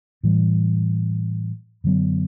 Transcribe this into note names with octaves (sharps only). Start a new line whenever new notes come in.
A2 E3 G3
F#2 D3 F#3 B3